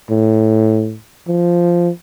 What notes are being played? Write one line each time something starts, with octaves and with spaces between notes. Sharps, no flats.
A2
F3